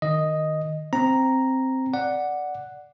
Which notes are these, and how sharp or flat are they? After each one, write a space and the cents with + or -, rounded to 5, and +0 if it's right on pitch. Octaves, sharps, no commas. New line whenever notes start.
D#3 -15 D#5 +0
C4 +0 A#5 +0
D5 +0 F#5 +0